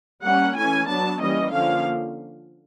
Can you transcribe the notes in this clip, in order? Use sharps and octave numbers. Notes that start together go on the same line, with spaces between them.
G3 A#3 C#4 F#5
E3 A3 C#4 G#5
F#3 B3 D4 A5
E3 G3 A#3 C#4 D#5
D3 F3 A#3 C#4 F5